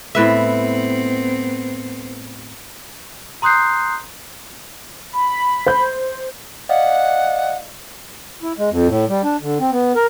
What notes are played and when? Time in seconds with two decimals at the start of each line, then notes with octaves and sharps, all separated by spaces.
0.15 A2 B3 C4 B4 E5
3.42 A#5 C6 D#6 F#6 G6 C7
5.13 B5
5.66 C5 G6
6.69 D5 D#5 F5 F#5
8.43 E4
8.58 G#3
8.71 F2
8.88 A2
9.09 G3
9.24 D4
9.41 D3
9.60 C4
9.71 B3
9.96 A#4